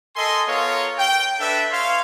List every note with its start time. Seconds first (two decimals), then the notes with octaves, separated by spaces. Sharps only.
0.16 A4 A#4 D#5 G#5 C6
0.47 B3 F4 A4 A#4 C#5 F5
0.98 G5
1.40 D4 A4 B4 E5
1.71 C#5 F5 C6